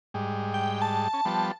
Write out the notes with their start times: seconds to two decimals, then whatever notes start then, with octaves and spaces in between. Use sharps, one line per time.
0.14 G#2 G3
0.54 G5
0.82 A5
1.13 C#4
1.25 F3 G3 B3